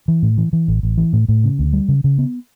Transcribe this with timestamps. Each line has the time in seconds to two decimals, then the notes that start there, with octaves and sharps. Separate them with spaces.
0.08 E3
0.23 A2
0.38 E3
0.53 E3
0.68 A1
0.83 A1
0.98 E3
1.13 A2
1.28 A2
1.44 C#3
1.59 D2
1.73 G3
1.88 C#3
2.04 C#3
2.18 B3